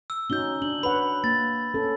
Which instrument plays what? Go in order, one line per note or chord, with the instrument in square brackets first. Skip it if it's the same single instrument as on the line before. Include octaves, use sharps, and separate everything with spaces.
[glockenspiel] E6
[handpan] C#4 D#4 F#4 [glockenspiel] G6 G7
[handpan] D4 [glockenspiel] F#7
[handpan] B4 C#5 F#5 [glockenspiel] B5
[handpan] A#3 [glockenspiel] A6
[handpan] C#4 A4